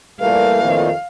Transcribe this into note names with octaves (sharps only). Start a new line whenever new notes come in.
A#2 E3 G3 A3 A4 A#4 F5
F2 D#3